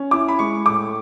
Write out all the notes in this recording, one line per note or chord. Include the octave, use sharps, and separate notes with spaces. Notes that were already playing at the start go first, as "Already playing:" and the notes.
Already playing: C#4
E4 D6
B5
G#3 C#6
A2 D6